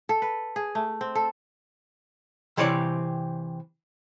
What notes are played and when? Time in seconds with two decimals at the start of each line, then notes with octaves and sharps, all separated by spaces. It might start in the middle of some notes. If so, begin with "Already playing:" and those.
0.09 A4
0.22 B4
0.56 G#4
0.75 A3
1.01 C4
1.15 A4
2.57 C3 E3 C4 C#5 D5